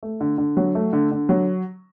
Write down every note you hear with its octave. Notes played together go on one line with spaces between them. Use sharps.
A3
D3
D3
F#3
A3
D3
D3
F#3